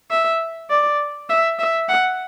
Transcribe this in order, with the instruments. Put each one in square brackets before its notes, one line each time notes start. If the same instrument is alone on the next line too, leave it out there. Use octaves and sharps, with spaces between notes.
[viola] E5
D5
E5
E5
F#5